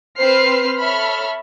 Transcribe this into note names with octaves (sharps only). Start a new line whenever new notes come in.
C4 B4 C5 F6 C7
A4 C#5 E5 B5 F6